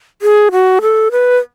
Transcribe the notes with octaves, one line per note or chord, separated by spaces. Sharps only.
G#4
F#4
A4
B4